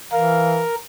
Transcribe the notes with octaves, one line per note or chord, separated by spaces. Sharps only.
E3 A#4 F5